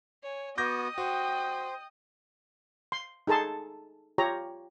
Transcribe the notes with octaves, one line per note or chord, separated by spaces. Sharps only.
C#5 G#5
B3 F#4 D#5 D6 D#6 G6 A#6
F#4 C5 G5
C6
D#4 G#4 A4 A5 C6
F4 G4 C#5 A#5